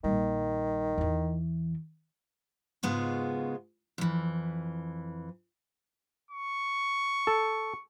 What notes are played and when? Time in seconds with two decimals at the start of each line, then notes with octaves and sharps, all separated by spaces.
0.04 A#1 D#3 G3
0.98 E2 E3
2.83 G#2 C#3 G#3 B3 F4 F#4
3.98 F2 E3
6.31 C#6
7.27 A4